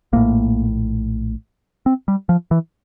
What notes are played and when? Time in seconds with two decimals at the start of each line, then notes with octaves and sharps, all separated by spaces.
0.13 A#1 A2 A#3
1.86 C4
2.08 G3
2.29 F3
2.51 E3